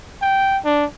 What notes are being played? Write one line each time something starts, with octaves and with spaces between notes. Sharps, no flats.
G5
D4